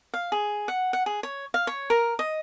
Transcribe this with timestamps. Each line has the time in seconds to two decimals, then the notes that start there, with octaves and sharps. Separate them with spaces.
0.14 F5
0.32 G#4
0.68 F#5
0.93 F#5
1.06 G#4
1.23 C#5
1.54 F5
1.67 C#5
1.90 A#4
2.19 D#5